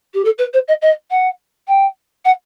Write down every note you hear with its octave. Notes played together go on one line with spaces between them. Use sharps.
G4
A4
B4
C5
D#5
D#5
F#5
G5
F#5